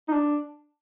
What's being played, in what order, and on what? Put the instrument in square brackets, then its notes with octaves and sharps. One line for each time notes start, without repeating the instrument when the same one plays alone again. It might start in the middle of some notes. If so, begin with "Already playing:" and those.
[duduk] D#4
D4